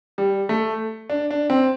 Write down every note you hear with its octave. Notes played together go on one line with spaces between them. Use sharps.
G3
A3
D4
D4
C4